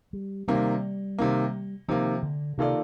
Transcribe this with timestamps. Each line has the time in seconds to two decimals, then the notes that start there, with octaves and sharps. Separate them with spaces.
0.13 G3
0.48 C3 D#3 G3 A#3
1.18 C3 D#3 A#3
1.88 C3 D#3 F3 A#3
2.23 D3
2.58 C3 D#3 A#3 F4 A4 D5